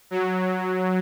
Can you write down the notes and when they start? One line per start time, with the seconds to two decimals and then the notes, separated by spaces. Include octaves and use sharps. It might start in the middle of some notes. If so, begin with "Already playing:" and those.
0.11 F#3